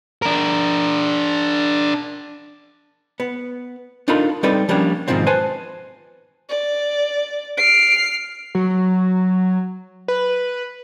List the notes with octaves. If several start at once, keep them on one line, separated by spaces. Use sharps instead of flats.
D4 A#4
B3
D4 D#4 F4 A4 A#4 B5
G3 C4 D#4 A4 B4 D5
F3 G3 A#3 C#4 D4
G#2 B2 D#3 F3 C4
B4 C5 G#5 A5
D5
F6 C7 D7
F#3
B4